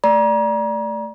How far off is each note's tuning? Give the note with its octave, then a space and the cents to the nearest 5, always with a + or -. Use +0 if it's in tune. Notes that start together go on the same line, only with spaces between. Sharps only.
A3 +5 D5 +0 A#5 +35